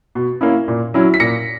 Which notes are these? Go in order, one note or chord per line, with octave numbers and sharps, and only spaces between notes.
B2
A#3 C#4 E4
A#2
F#3 C#4 E4
B6
A#2 A#6 C#7